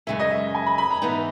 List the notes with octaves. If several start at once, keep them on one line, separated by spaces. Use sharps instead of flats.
F#2 C#3 G#3 C#4 E5
D#5
E5
G#5
B5
B5
A#5
G#2 E3 B3 D#4